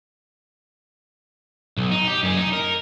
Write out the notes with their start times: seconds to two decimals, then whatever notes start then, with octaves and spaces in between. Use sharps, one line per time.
1.77 B1
1.91 D#4
2.08 G4
2.23 F#2 G#4
2.37 D#4
2.53 A#4